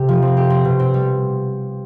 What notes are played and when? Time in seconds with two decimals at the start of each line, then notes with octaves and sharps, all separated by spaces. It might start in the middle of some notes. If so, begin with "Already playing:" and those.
Already playing: C3 G4
0.09 F3
0.22 C4
0.37 G4
0.50 C4
0.65 B2
0.80 C4
0.94 G3